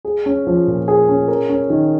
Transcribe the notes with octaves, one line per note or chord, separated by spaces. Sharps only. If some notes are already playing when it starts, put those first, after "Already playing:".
G#4
C#4
F3
A#2
G#4
C#4
A#4
C#4
D#3